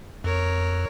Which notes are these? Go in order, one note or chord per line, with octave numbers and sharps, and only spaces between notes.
F2 A#4 C#5